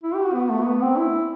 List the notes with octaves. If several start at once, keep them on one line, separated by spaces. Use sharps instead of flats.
E4
G4
F#4
B3
A3
B3
C4
E4